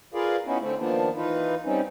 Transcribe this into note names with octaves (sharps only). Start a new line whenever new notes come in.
F4 G#4 A#4 B4 D5 F5
B3 C#4 D#4 E4 F#4
D3 A3 C4
D#3 F3 A#3 B3 D4
E3 D#4 F4 B4
G3 C4 C#4 D#4